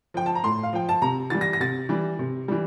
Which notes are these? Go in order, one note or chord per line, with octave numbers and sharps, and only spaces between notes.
F3 G5
A5
A#5
A2 C6
F5
F3 G5
A5
C3 A#5
E3 G3 A6
A#6
A#6
C3 A6
E3 G3
C3
E3 G3